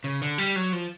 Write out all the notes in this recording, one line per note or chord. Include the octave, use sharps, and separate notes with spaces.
C#3
D3
G3
F#3
F3